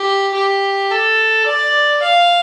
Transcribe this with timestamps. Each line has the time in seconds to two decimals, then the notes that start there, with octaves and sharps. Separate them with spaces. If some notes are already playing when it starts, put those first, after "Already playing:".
Already playing: G4
0.34 G4
0.91 A4
1.46 D5
2.03 F5